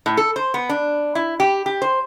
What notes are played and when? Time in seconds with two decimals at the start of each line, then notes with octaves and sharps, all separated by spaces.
0.06 A2
0.17 A4
0.36 C5
0.54 B3
0.69 D4
1.15 E4
1.40 G4
1.66 G4
1.82 C5